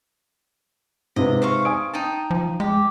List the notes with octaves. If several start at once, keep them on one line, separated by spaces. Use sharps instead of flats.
G#2 C3 B4 D#5
C5 F5 C#6
G#5 D#6 D7
D#4 G5 A5
F3
G#3 G4